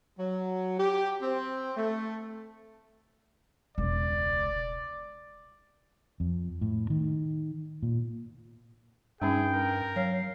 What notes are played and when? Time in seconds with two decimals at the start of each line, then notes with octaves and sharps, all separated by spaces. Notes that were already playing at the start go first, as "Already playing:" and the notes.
0.19 F#3
0.79 G4
1.22 C4
1.77 A3
3.78 E1 C#2 D5
6.20 F2
6.61 A2
6.90 D#3
7.83 A#2
9.22 G2 G3 C#4 D#4 G#4 G5
9.53 A#4
9.96 F#3 C#5 F5